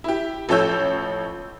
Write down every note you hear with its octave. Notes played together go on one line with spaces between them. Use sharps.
E4 G4
A1 F3 A4 C#5 E6 G6